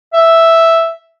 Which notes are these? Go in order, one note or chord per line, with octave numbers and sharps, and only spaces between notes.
E5